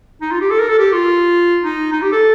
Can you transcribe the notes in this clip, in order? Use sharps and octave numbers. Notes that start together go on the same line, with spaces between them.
D#4
F4
G4
A4
A#4
A4
G4
F4
D#4
D#4
G4
A4